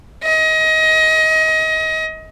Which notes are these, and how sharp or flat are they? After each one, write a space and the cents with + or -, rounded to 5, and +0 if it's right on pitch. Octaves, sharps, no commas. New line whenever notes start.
D#5 +25